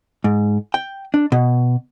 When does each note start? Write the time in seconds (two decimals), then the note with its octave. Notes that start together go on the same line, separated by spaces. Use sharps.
0.24 G#2
0.74 G5
1.14 D4
1.32 B2